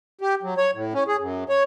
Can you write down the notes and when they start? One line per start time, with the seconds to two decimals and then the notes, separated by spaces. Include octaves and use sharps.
0.21 G4
0.43 F#3
0.57 C#5
0.75 A2
0.94 C#4
1.08 G#4
1.20 F#2
1.49 C#5